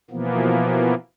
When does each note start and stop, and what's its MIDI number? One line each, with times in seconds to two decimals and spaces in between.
0.11 0.94 47
0.11 0.94 52
0.11 0.94 53
0.11 0.94 58
0.11 0.94 59